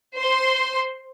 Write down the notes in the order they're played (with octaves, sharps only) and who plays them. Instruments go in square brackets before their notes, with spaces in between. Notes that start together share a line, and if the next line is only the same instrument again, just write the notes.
[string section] C5 C6